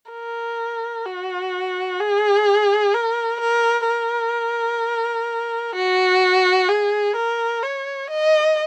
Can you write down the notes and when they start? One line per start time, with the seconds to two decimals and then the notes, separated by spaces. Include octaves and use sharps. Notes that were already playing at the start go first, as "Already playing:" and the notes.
0.12 A#4
1.06 F#4
2.00 G#4
2.94 A#4
3.40 A#4
3.87 A#4
5.75 F#4
6.69 G#4
7.16 A#4
7.63 C#5
8.10 D#5